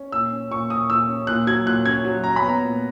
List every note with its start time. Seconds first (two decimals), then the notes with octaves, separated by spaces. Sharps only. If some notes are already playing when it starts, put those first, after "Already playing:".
Already playing: C#4
0.12 A#2 E6
0.32 C#4
0.51 A#2 C#6
0.70 A#2 D#6
0.89 A#2 E6
1.08 C#4
1.27 A#2 F#6
1.47 F#3 G#6
1.66 A#2 F#6
1.85 C#4 G#6
2.05 F#3
2.24 C#4 A#5
2.36 B5
2.43 B3
2.49 A#5
2.63 A#2